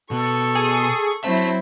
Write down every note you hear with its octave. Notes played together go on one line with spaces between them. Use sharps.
B2 B3 A4 C#6
G#4
F#3 C4 E4 E5 A5 B6